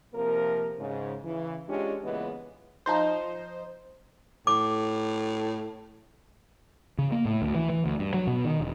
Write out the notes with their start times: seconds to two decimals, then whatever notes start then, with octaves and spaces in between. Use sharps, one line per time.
0.13 C3 F3 A#3 A#4
0.79 G#2 C#3
1.24 C#3 E3
1.69 G#3 C#4 D4 F4 G4
2.03 A#2 C#3 E3 G#3 B3 D#5
2.86 F3 D#4 C5
4.47 A2 D6
6.99 C#3
7.12 A#3
7.25 A2
7.42 D2
7.55 E3
7.70 E3
7.86 D2
7.99 G2
8.14 F#3
8.27 B2
8.45 D#3
8.60 E1